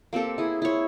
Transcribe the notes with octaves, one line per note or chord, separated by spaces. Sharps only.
A#3 C4 G4 A4
E4 G#4
E4 C#5